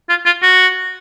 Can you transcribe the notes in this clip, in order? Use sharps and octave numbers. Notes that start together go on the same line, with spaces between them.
F4
F4
F#4